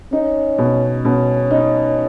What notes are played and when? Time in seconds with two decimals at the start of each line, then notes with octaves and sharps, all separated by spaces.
0.13 C#4 D#4
0.58 B2
1.04 B2 C#4
1.51 D#4